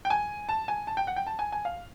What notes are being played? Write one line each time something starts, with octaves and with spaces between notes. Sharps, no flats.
G5
G#5
A5
G#5
A5
G5
F#5
G5
A5
G#5
G#5
F5